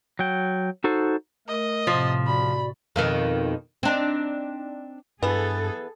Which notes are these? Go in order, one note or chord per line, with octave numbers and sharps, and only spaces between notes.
F#3 G5
D#4 F#4 A4 C5
A3 A#4 D#5
A2 C3 F3 C6 A6
F#4 D5 B5
F2 B2 D#3
C4 D4 D#4
G2 E3 B3 G#4 A4